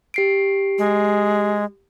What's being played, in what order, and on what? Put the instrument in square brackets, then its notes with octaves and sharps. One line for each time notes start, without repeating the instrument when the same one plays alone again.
[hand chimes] G4 C7 D7
[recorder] G#3